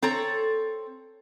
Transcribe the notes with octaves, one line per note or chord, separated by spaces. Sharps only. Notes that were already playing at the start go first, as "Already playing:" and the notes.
C4 A4 C#5 A#5